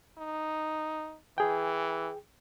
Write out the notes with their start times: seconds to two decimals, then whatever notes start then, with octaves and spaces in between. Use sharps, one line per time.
0.18 D#4
1.38 E3 G#4 G5